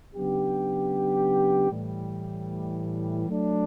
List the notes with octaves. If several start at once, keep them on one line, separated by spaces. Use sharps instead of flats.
C#3 F#3 B3 D4 G4
A2 E3 G3
F#3 A3 D4